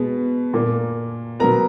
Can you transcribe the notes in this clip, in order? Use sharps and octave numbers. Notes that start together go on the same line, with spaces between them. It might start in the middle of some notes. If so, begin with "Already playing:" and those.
Already playing: B2 G#3 B3
A#2 A#3
B2 F#3 B3 A#4 A#5